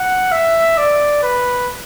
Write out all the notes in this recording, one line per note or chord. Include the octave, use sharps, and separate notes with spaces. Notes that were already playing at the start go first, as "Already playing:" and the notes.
Already playing: F#5
E5
D5
B4